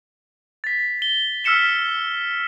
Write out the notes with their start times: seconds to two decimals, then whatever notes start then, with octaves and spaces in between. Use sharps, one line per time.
0.64 A6 B6
1.02 G7
1.44 E6 F6 B6 C#7 E7 G7